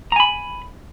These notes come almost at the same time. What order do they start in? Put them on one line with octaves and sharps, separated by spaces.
A#5 G#5 B5